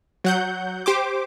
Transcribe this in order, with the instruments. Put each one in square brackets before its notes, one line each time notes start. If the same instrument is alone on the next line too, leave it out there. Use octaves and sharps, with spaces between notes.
[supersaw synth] F#3 F#5 G6
G4 C5 D6